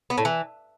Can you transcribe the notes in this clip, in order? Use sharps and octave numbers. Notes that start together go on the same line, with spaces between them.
B3
A2
E3